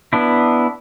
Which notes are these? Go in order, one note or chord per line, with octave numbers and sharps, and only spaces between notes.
B3 D4 E4